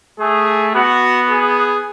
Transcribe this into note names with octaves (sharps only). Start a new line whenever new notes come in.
A3 G#4
B3 F#4
G#4